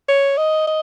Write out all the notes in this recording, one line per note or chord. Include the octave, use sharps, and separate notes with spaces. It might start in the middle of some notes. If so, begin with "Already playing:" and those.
C#5
D#5
D#5